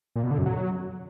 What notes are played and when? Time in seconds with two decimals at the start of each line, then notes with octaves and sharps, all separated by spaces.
0.16 A#2
0.23 B2
0.31 D3
0.38 F#2
0.46 F#3